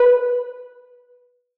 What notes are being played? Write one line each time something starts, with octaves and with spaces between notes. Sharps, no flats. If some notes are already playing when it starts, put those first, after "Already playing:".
Already playing: B4